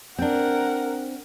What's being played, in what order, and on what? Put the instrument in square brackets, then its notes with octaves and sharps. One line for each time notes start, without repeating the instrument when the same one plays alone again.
[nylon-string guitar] C4 D4 [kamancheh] A#4 F#5